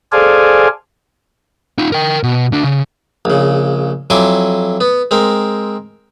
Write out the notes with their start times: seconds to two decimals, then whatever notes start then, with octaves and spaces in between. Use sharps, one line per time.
0.12 G#4 A4 C5 D5 F5 G#5
1.78 D#4 F4
1.92 A#4 G5
2.23 B2
2.52 D2 D4
2.64 C#3
3.25 A#1 C#3
4.10 F2 F#3 E4 G#5 C6 D6
4.81 B3
5.11 G#3 C4 A#4